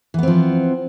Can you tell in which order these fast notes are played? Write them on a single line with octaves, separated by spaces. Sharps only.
E3 B3 C4 F3